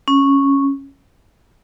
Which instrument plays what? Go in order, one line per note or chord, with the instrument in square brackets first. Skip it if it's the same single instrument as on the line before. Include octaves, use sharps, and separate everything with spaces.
[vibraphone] C#4